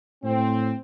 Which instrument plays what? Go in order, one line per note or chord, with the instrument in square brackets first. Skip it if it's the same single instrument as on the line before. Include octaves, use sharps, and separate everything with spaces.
[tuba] A2 [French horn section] C4